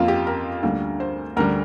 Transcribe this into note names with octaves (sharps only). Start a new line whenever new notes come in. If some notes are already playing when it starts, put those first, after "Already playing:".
Already playing: F2 F3 A#3 F4
G4
A#4
D2 D3 G3 A#3
C5
D2 D3 G3 A#4